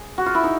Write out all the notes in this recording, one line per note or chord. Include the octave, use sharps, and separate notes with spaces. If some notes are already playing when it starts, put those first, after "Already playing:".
Already playing: G#4
F#4
F4
E4
D#4